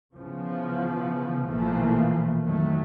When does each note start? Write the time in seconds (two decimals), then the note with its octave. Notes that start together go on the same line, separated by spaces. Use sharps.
0.14 C#3 E3 F3 B3
1.45 A#1 B2 E3 F3 A3 A#3
2.42 F2 D#3 F#3 A3